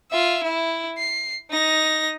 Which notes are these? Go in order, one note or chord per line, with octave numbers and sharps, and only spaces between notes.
F4 E5
E4
C7
D#4 A#6